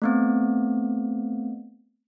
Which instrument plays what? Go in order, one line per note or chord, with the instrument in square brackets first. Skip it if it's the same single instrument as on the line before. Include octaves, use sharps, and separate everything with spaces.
[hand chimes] A3 B3 C4